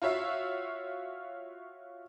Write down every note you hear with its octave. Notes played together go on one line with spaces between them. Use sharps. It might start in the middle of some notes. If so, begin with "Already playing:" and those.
F4 F#4 C#5 E5 F5